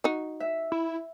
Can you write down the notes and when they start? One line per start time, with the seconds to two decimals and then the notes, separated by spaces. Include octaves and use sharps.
0.04 D#4 F#4
0.40 E5
0.72 E4